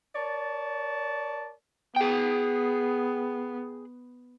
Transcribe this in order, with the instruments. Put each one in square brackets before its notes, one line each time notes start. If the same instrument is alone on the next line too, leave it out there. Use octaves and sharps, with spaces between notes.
[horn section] A#4 C#5 D5 A5
[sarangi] B3 [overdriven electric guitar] G#4 G5